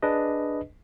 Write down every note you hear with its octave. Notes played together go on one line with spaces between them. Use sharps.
D4 G#4 B4 D#5